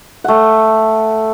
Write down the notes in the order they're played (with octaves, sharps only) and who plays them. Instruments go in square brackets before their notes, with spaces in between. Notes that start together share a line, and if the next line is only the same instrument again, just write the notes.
[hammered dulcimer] A3 F#5